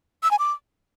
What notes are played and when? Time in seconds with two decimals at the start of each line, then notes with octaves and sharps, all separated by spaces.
0.23 E6
0.31 G#5
0.39 D6